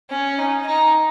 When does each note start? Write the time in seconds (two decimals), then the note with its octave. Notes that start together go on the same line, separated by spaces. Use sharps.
0.10 C#4
0.39 D#4
0.67 D#4